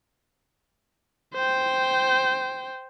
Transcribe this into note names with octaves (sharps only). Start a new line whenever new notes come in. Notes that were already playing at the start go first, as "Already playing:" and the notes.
C5 G5